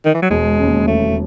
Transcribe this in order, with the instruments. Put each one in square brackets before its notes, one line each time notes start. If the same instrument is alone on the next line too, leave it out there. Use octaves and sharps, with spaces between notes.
[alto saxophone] D#3
E3
F#3
[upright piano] E1 [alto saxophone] G#3
[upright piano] D#2 C#3
[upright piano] E1 [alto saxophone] A3